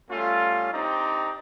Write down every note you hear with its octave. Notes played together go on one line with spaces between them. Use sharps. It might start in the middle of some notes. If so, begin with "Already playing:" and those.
G3 A3 C#4 F4
C4 D4 D#4 G4 D5 A#5